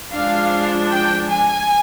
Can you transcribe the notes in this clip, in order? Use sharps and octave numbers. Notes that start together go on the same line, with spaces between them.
F3 G#3 D4 F5
G5
G#5